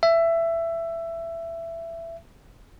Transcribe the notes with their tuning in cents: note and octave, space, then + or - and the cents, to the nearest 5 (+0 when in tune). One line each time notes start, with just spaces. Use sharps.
E5 +15